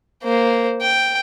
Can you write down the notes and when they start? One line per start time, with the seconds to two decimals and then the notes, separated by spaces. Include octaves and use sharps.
0.23 A#3 C5
0.82 G5